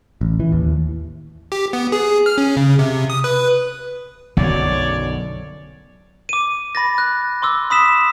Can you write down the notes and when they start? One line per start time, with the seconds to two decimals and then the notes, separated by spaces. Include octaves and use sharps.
0.21 A1
0.40 E3
0.52 D#2
1.52 G4
1.73 B3
1.92 G#4
2.26 F6
2.38 C#4
2.57 C#3
2.79 C3
3.10 D#6
3.24 B4
4.37 B1 F#2 D3 F#3 C#5 D5
6.29 D6 D#7
6.75 B5 A6 A#6
6.98 F#6
7.42 C6 D6 E6
7.70 B5 D#6 B6 E7